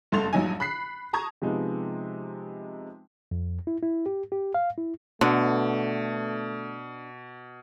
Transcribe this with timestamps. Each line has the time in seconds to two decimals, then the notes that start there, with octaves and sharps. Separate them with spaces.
0.12 F#1 G2 A3 C6 A6 F7
0.33 A#1 G2 F#3 D#4 G#5
0.60 B5 F#6 B6 C7
1.13 A5 A#5 C#6 D#6 G#6
1.42 C3 F3 G#3 B3 D#4
3.31 F2
3.67 E4
3.82 E4
4.06 G4
4.32 G4
4.54 F5
4.78 E4
5.21 B2 D3 A3 B3 D4